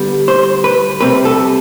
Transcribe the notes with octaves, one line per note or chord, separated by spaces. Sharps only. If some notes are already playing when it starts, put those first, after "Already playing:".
Already playing: D3 G3 B3
C5
B4
C3 G3 C4 B4
A4